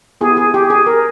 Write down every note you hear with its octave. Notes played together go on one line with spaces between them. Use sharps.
B3 E4 G4 G#4
G#4
G4
G#4
A#4